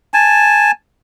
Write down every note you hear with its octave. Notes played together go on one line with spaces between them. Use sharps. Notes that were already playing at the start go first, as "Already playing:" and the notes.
G#5 A5